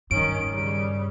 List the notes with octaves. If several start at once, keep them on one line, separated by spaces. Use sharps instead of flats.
G2 D#3 C#4 D7
C#3 G3